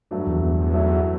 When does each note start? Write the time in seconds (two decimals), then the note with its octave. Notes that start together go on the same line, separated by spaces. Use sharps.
0.11 G2 F#3 A3 D4
0.27 E2
0.43 E2
0.72 F#3 A3 E4